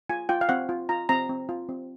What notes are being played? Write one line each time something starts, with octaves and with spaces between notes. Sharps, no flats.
F4 G#5
F4 G5
F5
C4 F#5
F4
F4 A#5
C4 A#5
C4
F4
C4